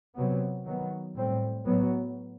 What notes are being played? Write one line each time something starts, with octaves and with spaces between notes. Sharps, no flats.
C3 F#3 B3
D#3 F#3 B3
A2 G3 C4
A2 F#3 B3